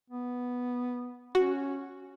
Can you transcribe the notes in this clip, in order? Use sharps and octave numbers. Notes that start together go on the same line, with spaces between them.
B3
C#4 F#4